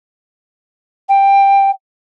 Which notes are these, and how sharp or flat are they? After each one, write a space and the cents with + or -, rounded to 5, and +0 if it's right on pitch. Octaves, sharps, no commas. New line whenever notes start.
G5 +15